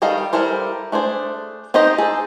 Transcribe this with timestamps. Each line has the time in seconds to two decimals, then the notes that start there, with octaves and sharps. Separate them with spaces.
0.02 D#3 G3 A4 D#5 F5
0.33 G3 E4 A4 A#4 C5
0.92 A3 D4 G#4 C5
1.74 C4 D#4 G4 C5 D#5
1.98 G#4 A4